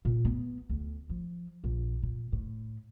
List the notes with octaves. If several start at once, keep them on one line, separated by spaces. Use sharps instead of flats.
A#2
B3
D2
F3
A#1
A#2
A2